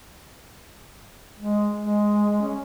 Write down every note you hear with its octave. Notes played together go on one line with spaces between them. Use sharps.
G#3
G#3
C#4